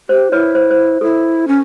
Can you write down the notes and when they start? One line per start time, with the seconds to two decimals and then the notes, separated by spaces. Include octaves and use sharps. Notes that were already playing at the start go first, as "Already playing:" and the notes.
0.09 G4 C5
0.32 E4 B4 C#5
0.55 C5
0.71 C5
1.01 E4 A4
1.48 C#4